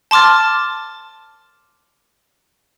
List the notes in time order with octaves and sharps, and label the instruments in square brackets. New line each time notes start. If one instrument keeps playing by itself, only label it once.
[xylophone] A5 C6 D6 F6 A6